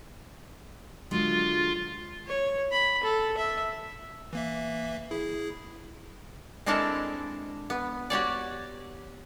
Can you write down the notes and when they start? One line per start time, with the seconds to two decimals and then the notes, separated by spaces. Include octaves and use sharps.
1.11 D3 F#3 G#3 F4
2.26 C#5
2.72 B5
3.03 A4
3.37 E5
4.33 E3 A#3 E5
5.11 E4 G#4
6.66 G#3 C4 D4 E4 A4 A#4
7.70 B3
8.10 F#4 G4 C#5 D5